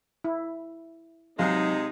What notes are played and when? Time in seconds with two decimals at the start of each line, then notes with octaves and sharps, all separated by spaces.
0.24 E4
1.39 C3 F#3 G#3 D#4 F5